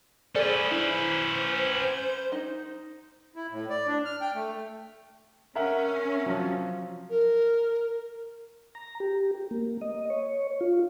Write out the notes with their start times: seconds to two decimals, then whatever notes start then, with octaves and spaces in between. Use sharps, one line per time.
0.35 C#4 G#4 A4 B4 C5 D5
0.71 E4
2.32 D#4
3.36 E4
3.51 A2
3.69 D5
3.87 D4
4.05 F6
4.21 G5
4.35 A3
5.55 C#4 A#4 E5 F#5
6.26 F3 F#3
7.10 A#4
8.75 A#5
9.00 G4
9.51 A#3
9.81 D#5
10.10 C#5
10.61 F4